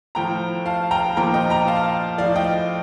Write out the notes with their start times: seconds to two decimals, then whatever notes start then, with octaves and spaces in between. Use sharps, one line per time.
0.15 A2 F3 G5 A#5
0.66 F5 A5
0.91 G5 A#5
1.17 A#2 F3 G5 A#5
1.34 D#5 G5
1.50 G5 A#5
1.67 F5 A5
2.18 A2 F3 D5 F5
2.35 D#5 G5